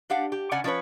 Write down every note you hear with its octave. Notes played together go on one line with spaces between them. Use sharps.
D4 G4 F5 F#5
G4
C#3 C#4 D5 F#5 G#5
F3 C#4 D4 G#4 B4 C#5